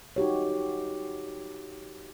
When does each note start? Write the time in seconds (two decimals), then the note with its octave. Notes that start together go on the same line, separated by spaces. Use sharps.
0.16 D#4 F#4 G4 C#5